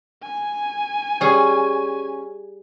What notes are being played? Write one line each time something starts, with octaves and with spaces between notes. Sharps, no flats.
G#5
G3 C#4 G#4